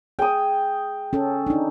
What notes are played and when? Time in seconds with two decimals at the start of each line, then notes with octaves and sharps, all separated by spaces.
0.19 G#4 G5 D#6
1.13 C#4 A4
1.47 D4 D#4